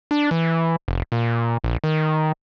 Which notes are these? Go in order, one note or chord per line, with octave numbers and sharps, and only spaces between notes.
D4
E3
F1
A#2
A#1
D#3